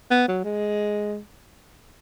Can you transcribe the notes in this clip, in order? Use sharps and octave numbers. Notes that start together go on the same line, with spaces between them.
B3
F#3
G#3